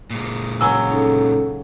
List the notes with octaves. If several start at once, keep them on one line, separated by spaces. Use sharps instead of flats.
A#2 G#3
C#3 F#3 E6
C#4 D#4 A4